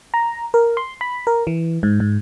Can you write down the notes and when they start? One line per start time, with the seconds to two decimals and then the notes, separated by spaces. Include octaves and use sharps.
0.14 A#5
0.54 A#4
0.77 C6
1.01 B5
1.27 A#4
1.47 E3
1.83 G#2
2.00 G#2